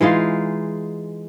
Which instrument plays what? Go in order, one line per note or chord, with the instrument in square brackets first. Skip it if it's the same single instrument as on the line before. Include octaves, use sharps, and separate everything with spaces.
[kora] E3 G#3 D#4 F4